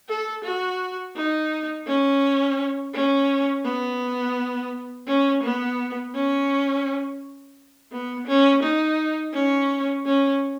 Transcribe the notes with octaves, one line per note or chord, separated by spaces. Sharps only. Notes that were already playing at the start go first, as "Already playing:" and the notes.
A4
F#4
D#4
C#4
C#4
B3
C#4
B3
C#4
B3
C#4
D#4
C#4
C#4